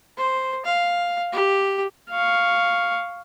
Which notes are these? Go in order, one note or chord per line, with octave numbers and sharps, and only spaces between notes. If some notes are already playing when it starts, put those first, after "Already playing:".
C5
F5
G4
F5 C#6